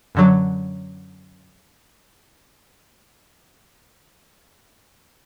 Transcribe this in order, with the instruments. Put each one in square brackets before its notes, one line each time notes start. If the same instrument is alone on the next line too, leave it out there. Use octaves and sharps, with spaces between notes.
[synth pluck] F#2 D3 F#3